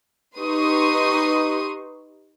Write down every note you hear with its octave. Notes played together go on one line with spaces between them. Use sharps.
D#4 G4 B4 C6 C#6 D#6